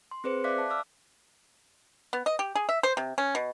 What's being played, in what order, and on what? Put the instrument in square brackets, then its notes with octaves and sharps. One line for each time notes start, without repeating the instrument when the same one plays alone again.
[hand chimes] C6
C4 G#4 B4 C5 C#7
D5 E5 F5 D6 F#6 B6
A5
D6 E6 F6
[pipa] B3
D#5
G4
G#4
E5
C5
C3
C#4
B2